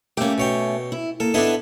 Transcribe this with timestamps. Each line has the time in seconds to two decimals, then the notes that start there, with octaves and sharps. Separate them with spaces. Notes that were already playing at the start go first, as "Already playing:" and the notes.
0.17 A3 A#3 C#4 G4
0.38 B2 C#5 G5
0.92 E4
1.20 A#3 A4
1.34 B3 D4 E4 A4 D#5 E5